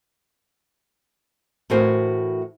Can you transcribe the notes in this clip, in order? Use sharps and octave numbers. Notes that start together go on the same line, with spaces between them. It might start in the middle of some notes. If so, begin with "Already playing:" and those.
A2 E3 F#4 A#4 C5 G#5